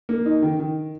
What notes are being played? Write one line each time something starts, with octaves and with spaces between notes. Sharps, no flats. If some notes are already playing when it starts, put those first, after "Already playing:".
A#3
D#4
D#3
D#3